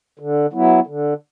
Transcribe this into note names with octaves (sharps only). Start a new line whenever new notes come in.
D3
F#3 B3 E4
D3